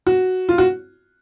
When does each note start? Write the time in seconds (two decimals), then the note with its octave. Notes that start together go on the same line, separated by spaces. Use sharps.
0.07 F#4
0.49 F4
0.58 F#4